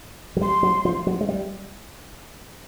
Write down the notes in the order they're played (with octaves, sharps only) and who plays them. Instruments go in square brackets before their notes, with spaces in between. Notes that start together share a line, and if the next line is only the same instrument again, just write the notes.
[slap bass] F#3
[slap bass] G3 [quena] C6
[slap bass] F#3
F3
F#3
G#3
G3